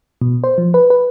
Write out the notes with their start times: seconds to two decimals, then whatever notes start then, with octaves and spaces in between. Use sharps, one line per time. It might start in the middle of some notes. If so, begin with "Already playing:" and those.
0.22 B2
0.44 C5
0.58 F3
0.74 B4
0.90 B4